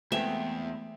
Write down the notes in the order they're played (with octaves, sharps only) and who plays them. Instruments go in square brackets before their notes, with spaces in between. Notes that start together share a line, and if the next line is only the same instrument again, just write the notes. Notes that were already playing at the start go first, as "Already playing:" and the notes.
[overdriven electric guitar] E2 [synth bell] G#3 A3 [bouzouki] B3 C4 [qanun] E5